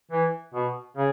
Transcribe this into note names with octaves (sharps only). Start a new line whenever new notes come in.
E3
B2
C#3